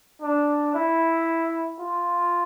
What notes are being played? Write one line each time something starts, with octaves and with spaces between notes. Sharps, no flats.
D4
E4
F4